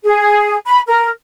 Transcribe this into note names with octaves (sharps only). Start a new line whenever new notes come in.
G#4
B5
A#4